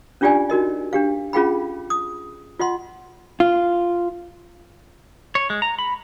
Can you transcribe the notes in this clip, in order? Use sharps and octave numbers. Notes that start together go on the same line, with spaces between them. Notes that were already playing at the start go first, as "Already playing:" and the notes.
C#4 D4 F4 G4 D5 G#5
D#4 F#4 A#4 D#5
D4 G4 F5
C#4 F4 G#4 F5 G5 B5
D#6
F4 D#5 F#5 C6
F4
C#5
G#3
A#5
B5